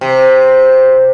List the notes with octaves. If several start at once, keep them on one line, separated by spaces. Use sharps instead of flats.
C3